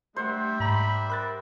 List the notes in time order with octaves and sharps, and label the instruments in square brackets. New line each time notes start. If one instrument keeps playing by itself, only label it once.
[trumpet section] G3 D4 E5 [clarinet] A3 [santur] C5 F#5
[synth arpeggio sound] G#2 A#5 [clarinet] B5
[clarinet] A#4 [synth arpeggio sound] B5 F#6 A6